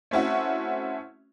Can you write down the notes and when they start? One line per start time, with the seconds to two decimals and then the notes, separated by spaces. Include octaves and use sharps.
0.11 A3 C4 C#4 E4 F#4